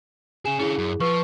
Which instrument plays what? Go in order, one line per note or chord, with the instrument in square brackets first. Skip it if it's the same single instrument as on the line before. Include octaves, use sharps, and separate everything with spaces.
[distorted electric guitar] C#3 G#4 [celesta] G#5 E7
[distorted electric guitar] D3 C#4 [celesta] E4 G#4
[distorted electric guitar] F#2
[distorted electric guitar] F3 [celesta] B4 C#6